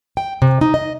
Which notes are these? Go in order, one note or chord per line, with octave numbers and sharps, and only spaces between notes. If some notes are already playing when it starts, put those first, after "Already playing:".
G5
C3
D#4
D#5